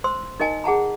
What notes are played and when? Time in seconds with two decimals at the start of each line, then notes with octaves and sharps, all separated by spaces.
0.04 C5 C6 E6
0.40 D#4 A#4 D#5 G#5 A5
0.64 G#4 F#5 A5 A#5